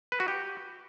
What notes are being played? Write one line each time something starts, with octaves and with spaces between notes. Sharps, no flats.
B4
F#4
G4